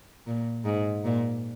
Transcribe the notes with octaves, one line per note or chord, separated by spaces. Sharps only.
A#2
G#2
A#2